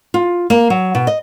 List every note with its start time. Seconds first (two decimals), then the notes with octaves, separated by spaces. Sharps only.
0.14 F4
0.50 A#3
0.70 F#3
0.95 B2
1.07 D#5